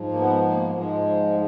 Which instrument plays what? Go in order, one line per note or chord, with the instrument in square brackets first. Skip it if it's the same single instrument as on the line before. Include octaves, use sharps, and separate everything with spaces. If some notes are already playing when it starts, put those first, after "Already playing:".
Already playing: [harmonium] G#2 F3
A#3
B3
A#3
G#2 F3 G#3